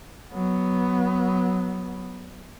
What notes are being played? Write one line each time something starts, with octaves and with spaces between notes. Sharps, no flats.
F#3 B3